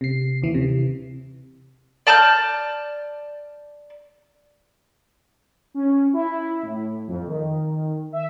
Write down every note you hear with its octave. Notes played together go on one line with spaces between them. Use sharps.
C3 C7
D#2 E3
C3
D5 A5 F6 G6
C#4
E4
A2
F2
D#3
E5